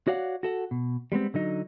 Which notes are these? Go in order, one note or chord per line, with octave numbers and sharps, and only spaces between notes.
F#4 C#5 D5 F5 F#5
F#4 A4 F#5
B2
G3 G#3 B3 C4
D3 F#3 D#4